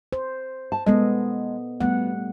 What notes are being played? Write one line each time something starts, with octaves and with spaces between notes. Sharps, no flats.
C5
A5
G#3 B3 A4 D#5
G3 A3 B3 F#5